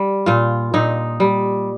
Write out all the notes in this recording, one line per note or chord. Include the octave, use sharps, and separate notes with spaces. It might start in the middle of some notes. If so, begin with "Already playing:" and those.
Already playing: G3
A#2 F4
A#2 D#4
G3